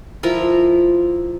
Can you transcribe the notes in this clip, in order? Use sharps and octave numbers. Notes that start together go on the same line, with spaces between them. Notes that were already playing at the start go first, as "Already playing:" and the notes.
F3 E4 F4 A#4